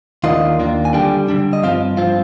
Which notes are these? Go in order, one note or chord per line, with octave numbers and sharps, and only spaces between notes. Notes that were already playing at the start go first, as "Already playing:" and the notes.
D#2 D#3 A#3 D4 F4 D#5
D#2 D#3 A#3 D4 F4
G#5
D3 G3 D4 G5
D3 G3 D4
D#5
G2 F3 C4 F4 F5
G2 F3 C4 F4